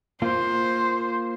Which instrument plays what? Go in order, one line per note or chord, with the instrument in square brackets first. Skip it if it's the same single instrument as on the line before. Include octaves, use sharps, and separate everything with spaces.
[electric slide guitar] A#3 F4 [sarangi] C5